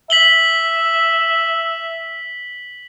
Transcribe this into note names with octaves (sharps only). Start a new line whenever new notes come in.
E5 B6 F#7 G7